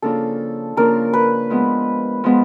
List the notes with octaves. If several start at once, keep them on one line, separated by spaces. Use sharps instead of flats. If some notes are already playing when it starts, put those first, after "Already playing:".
C#3 F3 A#3 D4 F4 A4
C#3 F3 A#3 D4 F4 A#4
B4
F3 G#3 B3
F3 G#3 B3